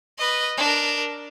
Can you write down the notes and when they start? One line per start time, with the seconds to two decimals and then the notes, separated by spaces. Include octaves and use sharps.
0.18 B4 D#5
0.58 D4 A#4